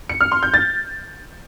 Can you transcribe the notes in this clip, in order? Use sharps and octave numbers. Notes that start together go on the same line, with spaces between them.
C#7
F6
C6
G6
A6